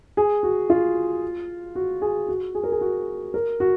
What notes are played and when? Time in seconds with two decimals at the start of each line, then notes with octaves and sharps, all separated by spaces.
0.17 G#4
0.43 F#4
0.70 F4
1.75 F#4
2.02 G#4
2.28 F#4
2.55 G#4
2.64 A#4
2.72 G#4
2.81 F#4
3.34 A#4
3.60 F#4